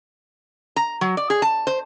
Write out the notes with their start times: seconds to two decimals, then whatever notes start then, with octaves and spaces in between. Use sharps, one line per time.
0.76 A#5
1.01 F#3
1.17 D5
1.30 G#4
1.42 A5
1.67 C5